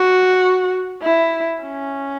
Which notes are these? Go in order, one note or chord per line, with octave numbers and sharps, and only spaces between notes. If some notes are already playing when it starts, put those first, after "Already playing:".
Already playing: F#4
E4
C#4